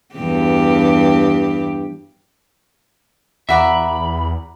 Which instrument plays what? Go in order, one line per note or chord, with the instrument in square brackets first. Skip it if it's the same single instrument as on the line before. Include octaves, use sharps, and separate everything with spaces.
[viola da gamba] E2 G2 G4
[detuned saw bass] E2 [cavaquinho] F#4 D5 A#5 [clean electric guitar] E5 [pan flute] B5